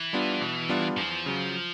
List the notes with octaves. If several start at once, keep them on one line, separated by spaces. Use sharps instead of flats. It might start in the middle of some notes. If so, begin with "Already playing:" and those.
Already playing: E3
G3 B3 D4 F4
B2
G3 B3 D4 F4
E2 F3
C#3 F#3